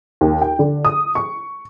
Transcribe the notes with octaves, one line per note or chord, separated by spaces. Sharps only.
D#2
G5
D3
D#6
C#6